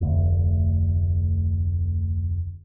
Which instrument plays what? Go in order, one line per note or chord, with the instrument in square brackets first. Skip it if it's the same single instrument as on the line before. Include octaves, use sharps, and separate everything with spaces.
[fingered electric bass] F1 D2